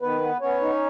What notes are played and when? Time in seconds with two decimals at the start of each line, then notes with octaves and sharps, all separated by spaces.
0.01 D#3 B3 B4
0.21 B3
0.41 B3 C#4 C#5
0.61 D#4